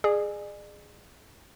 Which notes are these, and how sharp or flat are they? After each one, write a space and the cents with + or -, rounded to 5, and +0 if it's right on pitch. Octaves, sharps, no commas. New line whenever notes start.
G#4 +0 D5 +45